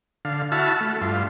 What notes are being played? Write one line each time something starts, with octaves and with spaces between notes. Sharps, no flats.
D3 F5
E4 F#4 A5 E6 F6
A3
G2 F4